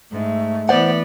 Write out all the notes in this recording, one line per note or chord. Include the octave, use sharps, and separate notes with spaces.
G#2 A3
E3 B3 C5 D5 F#5